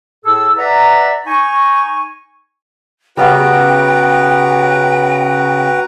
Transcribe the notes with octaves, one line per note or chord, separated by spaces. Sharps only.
A2 G#4 A4 A5 E6
B4 D5 E5 F#5 A#5
D#4 G#5 C#6
C#3 G3 B3 F#4 B4 G5 A#5